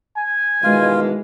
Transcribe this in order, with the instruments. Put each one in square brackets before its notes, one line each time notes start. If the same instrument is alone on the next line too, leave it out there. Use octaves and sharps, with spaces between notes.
[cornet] G#5
[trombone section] B2 D#3 E3 [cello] G#3 [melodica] F4